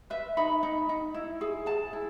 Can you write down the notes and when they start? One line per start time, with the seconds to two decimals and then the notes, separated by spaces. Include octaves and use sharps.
0.10 B4 E5
0.37 D#4 B5
0.63 D#4
0.89 D#4
1.14 E4
1.41 G#4
1.66 G#4 A5
1.93 E4